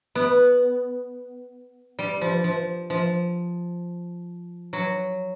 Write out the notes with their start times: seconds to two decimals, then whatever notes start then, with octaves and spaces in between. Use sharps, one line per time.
0.15 B3
1.99 G3
2.21 F3
2.44 F3
2.90 F3
4.73 F#3